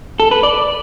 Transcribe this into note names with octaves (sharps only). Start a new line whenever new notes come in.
A4
B4
D5